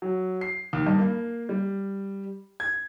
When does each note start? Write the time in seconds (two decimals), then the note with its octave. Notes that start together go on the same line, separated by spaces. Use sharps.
0.02 F#3
0.41 C7
0.73 D#2
0.87 G2
0.98 A#3
1.49 G3
2.60 G#6